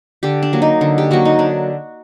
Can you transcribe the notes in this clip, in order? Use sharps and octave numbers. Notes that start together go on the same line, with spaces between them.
D3 G4
D4
F#3 A#3
D#4
D3
G4
F#3 A#3 F#4
D#4
D3 D4